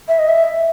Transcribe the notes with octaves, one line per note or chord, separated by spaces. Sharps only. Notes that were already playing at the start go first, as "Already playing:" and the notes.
E5
D#5
E5